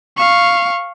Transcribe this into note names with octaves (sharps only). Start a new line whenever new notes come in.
F5 C#6